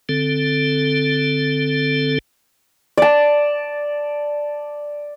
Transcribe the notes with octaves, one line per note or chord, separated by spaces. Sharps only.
D3 C4 A4
D5 A5